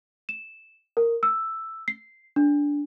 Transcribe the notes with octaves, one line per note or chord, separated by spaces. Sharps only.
E7
A#4
E6
C7
D4